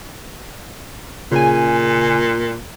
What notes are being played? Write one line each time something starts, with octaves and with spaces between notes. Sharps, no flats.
A#2 C#3 G#5